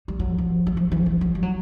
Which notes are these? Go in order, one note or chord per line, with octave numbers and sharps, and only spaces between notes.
G3
F#3
F3
F#3
F3
E3
F3
F#3
G3
F#3